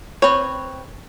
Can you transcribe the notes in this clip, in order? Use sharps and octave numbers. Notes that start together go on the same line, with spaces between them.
C4 B4 C#5